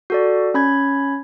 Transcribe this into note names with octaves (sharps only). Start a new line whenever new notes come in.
F#4 A4 D5
C#4 B5 G#6